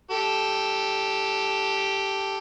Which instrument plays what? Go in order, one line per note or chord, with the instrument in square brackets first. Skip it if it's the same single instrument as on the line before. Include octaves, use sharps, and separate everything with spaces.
[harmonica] G4 A4